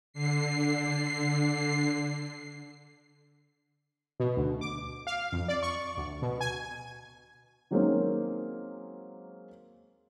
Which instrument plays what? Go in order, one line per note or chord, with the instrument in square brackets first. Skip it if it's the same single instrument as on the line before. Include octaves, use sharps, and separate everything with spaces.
[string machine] D3 C7
[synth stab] B2
D2
D6
F5
F2
D5
C#6
D2
B2
G#5
[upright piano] D#3 F#3 G#3 A#3 C4 C#4